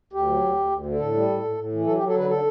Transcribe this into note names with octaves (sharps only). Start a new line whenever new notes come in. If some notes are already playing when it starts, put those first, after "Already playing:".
D2 G4
F#3
D2
D2
D2
D3
A2 A4
G3
A2
A2
A2
E3
F#3 A4
G4
F#3
A4
D3 B4
D3 A4